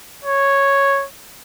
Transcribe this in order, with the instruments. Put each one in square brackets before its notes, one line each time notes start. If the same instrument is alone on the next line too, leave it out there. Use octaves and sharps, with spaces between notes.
[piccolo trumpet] C#5